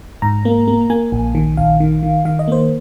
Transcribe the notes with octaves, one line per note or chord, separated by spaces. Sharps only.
G#2 A#5
A#3
A#3
A#3 G#5
A#1
D#3
A#1 F5
D#3
D#3
D#3 F5
D#5
A#3 C5